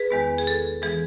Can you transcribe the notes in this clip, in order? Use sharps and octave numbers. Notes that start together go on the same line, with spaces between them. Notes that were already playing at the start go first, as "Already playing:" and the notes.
Already playing: G#4 B4
E2 D#3 G#3 B3
G#4
A4
E3 G#3 B3 G#4